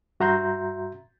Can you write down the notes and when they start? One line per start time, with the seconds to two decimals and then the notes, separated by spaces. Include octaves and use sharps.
0.20 G2 F#4 E5 A#5 C6 G6